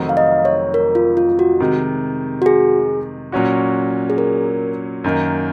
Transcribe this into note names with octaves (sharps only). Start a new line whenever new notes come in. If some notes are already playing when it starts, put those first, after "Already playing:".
Already playing: F1 F2 D#3 F#3 C4
F5
D#5
C#5
A#4
F4
F4
F#4
C3 D#3 G#3
F#4
G#4
A#2 F#3 C#4 F#4
G#4
A#4
F#2 D#3 A#3